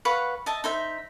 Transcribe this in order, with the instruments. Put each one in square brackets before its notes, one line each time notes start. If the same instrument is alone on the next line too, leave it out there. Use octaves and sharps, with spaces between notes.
[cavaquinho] B4 C#5 F5 F#5
D#5 E5 A5
D#4 C5 E5